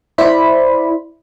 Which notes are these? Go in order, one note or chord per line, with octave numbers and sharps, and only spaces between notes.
E4 C5 D5 B5